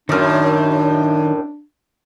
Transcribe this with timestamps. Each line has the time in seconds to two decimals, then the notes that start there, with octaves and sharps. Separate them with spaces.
0.09 F#2 A2 D#3 D4 D5 F6